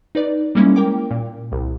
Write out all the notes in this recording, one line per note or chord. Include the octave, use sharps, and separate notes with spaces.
D#4 B4 D5
G3 G#3 A#3 C#4 E4
A#4 G5 D6
A#2
C2